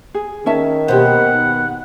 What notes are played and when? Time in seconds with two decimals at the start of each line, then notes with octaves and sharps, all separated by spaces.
0.14 G#4
0.46 D#3 C#4 E5 A5
0.88 D#2 B2 G4 C5 F#5